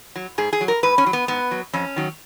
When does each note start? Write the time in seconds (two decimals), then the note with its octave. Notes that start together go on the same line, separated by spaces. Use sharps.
0.16 F#3
0.38 G#2 G#4
0.53 G#4
0.61 F#3
0.68 A#4
0.83 G#2 B4
0.98 C#4
1.06 F#3
1.13 B3
1.28 G#2 B3
1.51 F#3
1.73 F2 C#4
1.96 D#3 F#3